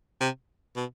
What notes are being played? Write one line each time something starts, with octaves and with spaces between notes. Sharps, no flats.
C3
B2